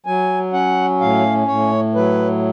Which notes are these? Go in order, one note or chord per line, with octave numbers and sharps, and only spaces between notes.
F#3 G#5
C#4 F#5
A2 F5
A2 C#5
F#3 B4